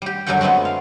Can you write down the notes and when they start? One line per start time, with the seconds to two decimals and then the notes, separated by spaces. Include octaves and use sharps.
0.02 G3 G4
0.26 F#2 D3 G3 C#4 F#5 G5
0.41 G#3 A3 B3 C4 F#4
0.65 F5